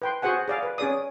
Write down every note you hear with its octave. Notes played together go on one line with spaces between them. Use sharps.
B4 G5 C6
F#4 G#4 C5 F#5 G#5
G#4 D5 F5
B4
C#4 G#4 D5 D#6